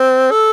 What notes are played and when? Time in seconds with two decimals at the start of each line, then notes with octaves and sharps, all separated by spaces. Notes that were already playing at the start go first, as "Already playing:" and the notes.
Already playing: C4
0.31 A4